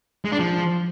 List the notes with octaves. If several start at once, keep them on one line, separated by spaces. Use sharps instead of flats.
G#3
D4
F3